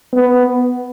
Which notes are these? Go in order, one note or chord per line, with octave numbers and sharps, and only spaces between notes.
B3